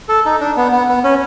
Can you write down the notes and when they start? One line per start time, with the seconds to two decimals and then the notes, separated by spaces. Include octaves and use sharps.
0.09 A4
0.25 D#4
0.40 D4
0.57 B3
0.72 B3
0.88 B3
1.04 C#4